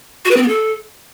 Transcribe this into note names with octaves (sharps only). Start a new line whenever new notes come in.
F#4
B4
C4
B3
A4